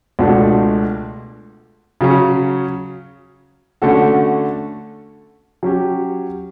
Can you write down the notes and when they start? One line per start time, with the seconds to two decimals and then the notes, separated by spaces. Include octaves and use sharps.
0.19 C#2 B2 A3 D4 F#4
2.01 C#3 F#3 C#4
3.82 D3 A3 C#4 F#4 A4
5.63 F#3 C#4 G4